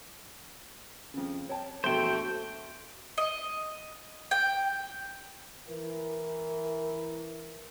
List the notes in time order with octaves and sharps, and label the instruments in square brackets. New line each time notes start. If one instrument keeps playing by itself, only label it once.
[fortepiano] F2 C#3
C#5 G5 A5
[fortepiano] A#1 E2 B3 [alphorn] A3 [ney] F#4 [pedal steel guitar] C5 G5
[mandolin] D#5
G5
[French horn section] E3 A#4